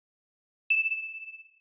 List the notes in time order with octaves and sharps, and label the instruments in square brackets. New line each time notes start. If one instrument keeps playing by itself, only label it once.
[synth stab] E7